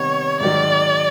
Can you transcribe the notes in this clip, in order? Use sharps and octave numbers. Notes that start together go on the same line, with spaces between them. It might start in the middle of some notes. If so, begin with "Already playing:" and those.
Already playing: C3 D#3 G3 B3 C#5
G#2 D#3 F#3 D5